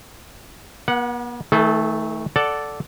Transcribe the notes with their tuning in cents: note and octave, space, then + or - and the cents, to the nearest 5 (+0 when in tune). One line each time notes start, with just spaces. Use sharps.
B3 -45 F#5 -5
D#3 +45 A3 +0 A4 -45
A4 +0 D5 -5 F#5 +0